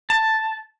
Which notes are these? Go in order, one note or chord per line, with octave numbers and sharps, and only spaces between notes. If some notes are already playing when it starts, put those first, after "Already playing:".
A5